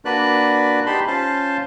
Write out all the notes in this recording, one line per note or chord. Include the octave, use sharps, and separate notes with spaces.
A#3 D4 F#4 B4 D5 F#6
D#4 G4 A5 B5 C6
C#4 F4 C5 F5 A5 C6